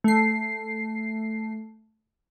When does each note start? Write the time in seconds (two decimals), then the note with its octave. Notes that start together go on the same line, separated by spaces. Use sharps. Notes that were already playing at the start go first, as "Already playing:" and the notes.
0.04 A3 C7